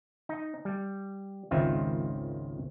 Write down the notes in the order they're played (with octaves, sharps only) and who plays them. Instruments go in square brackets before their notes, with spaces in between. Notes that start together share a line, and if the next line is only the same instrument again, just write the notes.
[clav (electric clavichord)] D#4
G3
G#1 C#2 D#3 C4 F4 E5